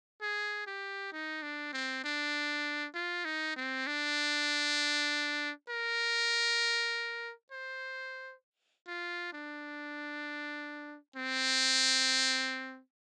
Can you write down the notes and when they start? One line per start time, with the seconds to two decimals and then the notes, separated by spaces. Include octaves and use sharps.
0.22 G#4
0.67 G4
1.13 D#4
1.43 D4
1.73 C4
2.04 D4
2.95 F4
3.25 D#4
3.56 C4
3.87 D4
5.69 A#4
7.52 C5
8.88 F4
9.33 D4
11.16 C4